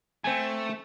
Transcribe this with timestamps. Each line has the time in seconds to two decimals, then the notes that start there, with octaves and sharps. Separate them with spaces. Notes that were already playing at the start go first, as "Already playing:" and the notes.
0.24 A3 C4 G#5